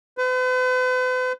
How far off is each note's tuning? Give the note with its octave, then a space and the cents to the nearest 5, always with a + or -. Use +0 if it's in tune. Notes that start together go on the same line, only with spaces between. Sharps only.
B4 +45